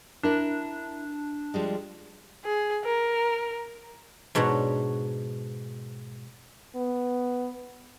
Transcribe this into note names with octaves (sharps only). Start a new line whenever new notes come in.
D4 E4 A#4
F3 G3 G#3
G#4
A#4
G#2 B2 D4 C#5 F#5
B3